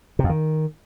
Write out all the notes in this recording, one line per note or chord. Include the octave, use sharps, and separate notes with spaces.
C3
F2
D#3